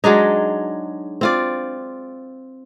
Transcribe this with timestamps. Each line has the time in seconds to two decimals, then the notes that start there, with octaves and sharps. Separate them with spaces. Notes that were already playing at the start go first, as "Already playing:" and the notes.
0.04 F#3 G#3 D4 D#4
1.21 C4 F4 D5